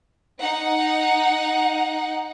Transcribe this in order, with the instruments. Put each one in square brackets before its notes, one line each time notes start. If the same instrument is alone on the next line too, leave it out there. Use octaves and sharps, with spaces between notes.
[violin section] D#4 F#5